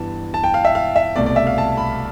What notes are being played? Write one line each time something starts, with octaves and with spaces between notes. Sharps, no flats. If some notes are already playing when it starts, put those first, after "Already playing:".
Already playing: G2 E3 B3 A5
A5
G5
F5
E5
F5
E5
C2 B2 A3 D5
D5
E5
F5
A5
B5